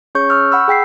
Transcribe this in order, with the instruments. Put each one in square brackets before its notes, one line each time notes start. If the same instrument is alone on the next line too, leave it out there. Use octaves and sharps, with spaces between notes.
[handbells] C#4 G#4 C#5 C#6 G6
C#6 E6 F6 G6
F#5 B5 E6 G6
G#4 G5 B6 C7